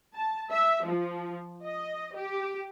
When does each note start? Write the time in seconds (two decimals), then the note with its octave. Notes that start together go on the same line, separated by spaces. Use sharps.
0.15 A5
0.52 E5
0.85 F3
1.64 D#5
2.16 G4